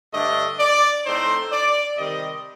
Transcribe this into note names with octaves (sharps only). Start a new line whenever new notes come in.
G2 D3 A3 D4 D#5
D5
A2 A3 C4 D#4 C5
D5
C3 D#3 G3 C4 D#5